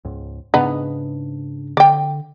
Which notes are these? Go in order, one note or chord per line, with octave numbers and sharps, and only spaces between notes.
C#2 G#2
G#2 C#3 B3 D4 D#4
D3 D5 G5